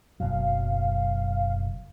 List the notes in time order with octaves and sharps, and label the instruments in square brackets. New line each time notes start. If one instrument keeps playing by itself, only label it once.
[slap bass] F#1 B2 F#3 [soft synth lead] F5